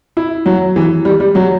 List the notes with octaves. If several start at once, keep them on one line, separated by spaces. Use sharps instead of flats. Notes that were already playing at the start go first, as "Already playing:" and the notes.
E4
F#3
E3
G3
G3
F#3